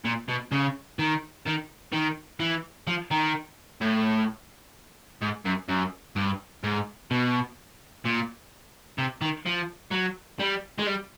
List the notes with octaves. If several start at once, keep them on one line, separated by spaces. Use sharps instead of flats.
A#2
B2
C#3
D#3
D#3
D#3
E3
F3
D#3
A2
G#2
F#2
F#2
G2
G#2
B2
A#2
C3
D#3
F3
F#3
G3
G#3
G3